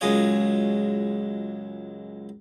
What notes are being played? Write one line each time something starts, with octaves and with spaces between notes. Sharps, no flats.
C#2 F#2 G#3 F4 C#5 D#6